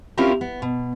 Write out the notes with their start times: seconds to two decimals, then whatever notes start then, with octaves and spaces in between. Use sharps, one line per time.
0.18 C4 C#4 E4 F4 G4 A#4
0.41 B3
0.62 B2